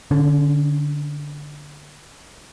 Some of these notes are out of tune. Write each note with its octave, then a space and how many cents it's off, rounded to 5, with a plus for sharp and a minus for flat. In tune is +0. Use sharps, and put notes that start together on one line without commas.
D3 +0 C#4 +25